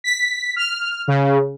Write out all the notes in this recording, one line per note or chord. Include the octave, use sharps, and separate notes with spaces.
B6
F6
C#3